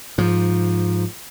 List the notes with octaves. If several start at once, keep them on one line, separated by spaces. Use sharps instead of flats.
G#2 F3